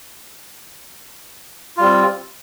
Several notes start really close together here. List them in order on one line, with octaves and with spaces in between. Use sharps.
F4 G3 C4